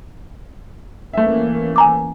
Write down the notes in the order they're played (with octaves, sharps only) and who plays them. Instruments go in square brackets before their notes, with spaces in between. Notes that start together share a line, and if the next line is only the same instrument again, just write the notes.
[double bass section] E3 A#3 C#4 [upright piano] A3 E5
[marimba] G#5 A#5 D6